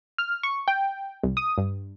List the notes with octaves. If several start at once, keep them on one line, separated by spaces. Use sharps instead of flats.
F6
C#6
G5
C2
D#6
G2